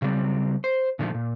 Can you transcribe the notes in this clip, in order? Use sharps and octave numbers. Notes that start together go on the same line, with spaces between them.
C#3 F#3 G3 C4
C5
A#2 D3 D#3 F3 A3
A#2